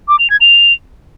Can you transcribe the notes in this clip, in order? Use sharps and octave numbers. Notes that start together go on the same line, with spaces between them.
D6
F7
G#6
F7